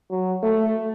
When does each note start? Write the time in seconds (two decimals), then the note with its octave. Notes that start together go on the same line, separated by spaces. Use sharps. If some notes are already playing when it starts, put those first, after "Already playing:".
0.11 F#3
0.43 A3